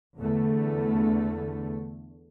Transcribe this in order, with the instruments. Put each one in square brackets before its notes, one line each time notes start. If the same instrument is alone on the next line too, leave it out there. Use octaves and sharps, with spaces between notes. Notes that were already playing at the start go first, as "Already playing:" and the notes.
[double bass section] E2 D3 A3